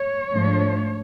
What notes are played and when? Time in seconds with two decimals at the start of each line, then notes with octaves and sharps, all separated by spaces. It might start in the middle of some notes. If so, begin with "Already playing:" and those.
Already playing: C#5
0.32 G#2 F3 A3 D4